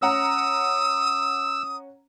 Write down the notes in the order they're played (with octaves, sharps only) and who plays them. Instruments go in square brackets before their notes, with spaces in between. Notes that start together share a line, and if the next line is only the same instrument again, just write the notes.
[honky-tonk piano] C#4 F#5 A#5 [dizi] D#6 [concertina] E6